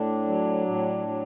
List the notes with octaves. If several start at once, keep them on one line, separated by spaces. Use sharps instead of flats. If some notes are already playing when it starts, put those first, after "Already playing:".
Already playing: A2 D4
F#3
A2
F#3